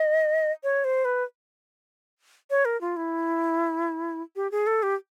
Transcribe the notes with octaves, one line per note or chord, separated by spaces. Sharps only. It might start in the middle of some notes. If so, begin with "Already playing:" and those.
Already playing: D#5
C#5
C5
B4
C#5
A#4
F4
E4
G4
G#4
A4
G4